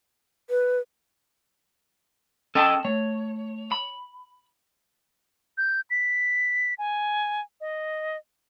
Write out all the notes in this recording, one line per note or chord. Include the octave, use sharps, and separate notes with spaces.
B4
C#4 A4 D#5 G5 A5
A3 C#5
B5
G6
B6
G#5
D#5